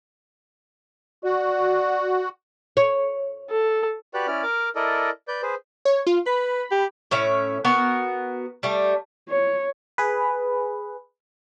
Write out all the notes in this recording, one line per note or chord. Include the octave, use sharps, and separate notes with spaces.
F#4 D5
C#5
A4
F#4 G4 B4 D5 F#6
C#4 E4 D5 F6
A#4 D6 F6
E4 A4 A#4 D5 D#5
B4 D5 G6
G#4 B4 C5
C#5
F4
B4 B5
G4
A2 C#4 E5
B3 F#4 A#4
G3 A3
C#5
G#4 B4